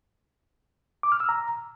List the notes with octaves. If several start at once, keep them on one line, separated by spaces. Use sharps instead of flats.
D6
F6
E6
A#5